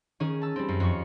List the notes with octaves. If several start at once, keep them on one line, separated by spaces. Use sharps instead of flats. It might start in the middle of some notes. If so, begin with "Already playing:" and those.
D#3 C#4 G#4
A5 E6
G3 C4
F#2
F2 C#6